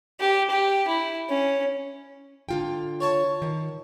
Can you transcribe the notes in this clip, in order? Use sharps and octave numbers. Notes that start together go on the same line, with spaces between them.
G4
G4
E4
C#4
D3 F4 G5
C#5 A5 C#6
D#3